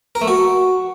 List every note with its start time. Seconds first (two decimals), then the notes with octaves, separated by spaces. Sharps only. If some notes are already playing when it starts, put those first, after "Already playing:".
0.15 A#4
0.21 A3
0.28 F#4